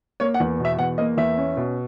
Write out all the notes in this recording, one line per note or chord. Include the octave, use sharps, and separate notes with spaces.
A#3 C#5
F#5
E2
B2
E5
E2 F#5
A#3 D#5
E2 E5
C#4
B2